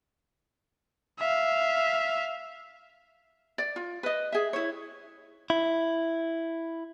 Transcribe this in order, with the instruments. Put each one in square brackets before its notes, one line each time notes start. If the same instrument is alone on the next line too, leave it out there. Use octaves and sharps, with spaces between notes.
[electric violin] E5 F5
[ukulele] D5
F4
B4 D#5
G#4 E5
E4 C#5
[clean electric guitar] E4